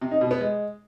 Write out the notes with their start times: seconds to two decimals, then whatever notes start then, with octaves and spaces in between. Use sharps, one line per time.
0.01 C3
0.11 D#4
0.21 B2
0.31 B3
0.41 G#3